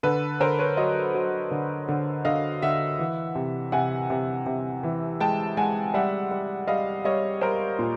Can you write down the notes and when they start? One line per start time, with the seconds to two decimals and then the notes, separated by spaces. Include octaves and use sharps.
0.03 D3 A4 B4
0.40 D3 A#4 C5
0.59 B4 C#5
0.77 F#3 C#5 D#5
1.14 F#3
1.51 D3
1.89 D3
2.25 D3 D#5 F5
2.62 D3 E5 F#5
2.98 E3
3.35 C3
3.72 C3 F#5 G#5
4.10 C3
4.46 C3
4.83 E3
5.20 G#3 G5 A5
5.57 G#3 F#5 G#5
5.94 G3 E5 F#5
6.31 G3
6.68 G3 D#5 F5
7.04 G3 C#5 D#5
7.41 G3 A#4 C5
7.79 A#2